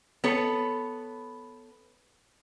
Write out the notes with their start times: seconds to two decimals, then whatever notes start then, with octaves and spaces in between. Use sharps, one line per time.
0.24 B3 A4 C#5